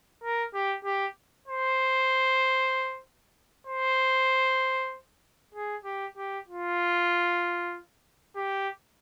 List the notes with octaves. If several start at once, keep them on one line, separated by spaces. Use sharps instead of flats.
A#4
G4
G4
C5
C5
G#4
G4
G4
F4
G4